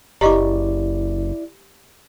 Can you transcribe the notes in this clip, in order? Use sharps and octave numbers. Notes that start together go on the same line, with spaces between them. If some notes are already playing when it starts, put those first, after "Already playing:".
F#1 E4 G4 D5 D#5 A#5 C#6 D6